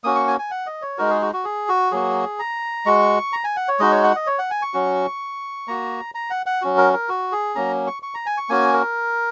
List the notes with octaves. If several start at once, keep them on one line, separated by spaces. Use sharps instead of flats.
A#3 C#4 F#4 D#6
C#6
G#5
G#5
F#5
D#5
C#5
G#3 D#4 F#4 A#4
G#4
F#4
F#4
G#4
F#4
F#3 A#3 F#4 G#4
A#5
G#3 F#4 C#6
A#5
G#5
F#5
C#5
G#3 D#4 F#4 D#5
C#5
F#5
D#5
C#5
F#5
G#5
C#6
F#3 C#4 F#4
A#3 F#4 A#5
A#5
F#5
F#5
F#3 C#4 F#4
A#4
A#4
F#4
G#4
F#3 A#3 C#4 A#5
C#6
C#6
A#5
G#5
C#6
A#3 C#4 F#4 G#5
A#4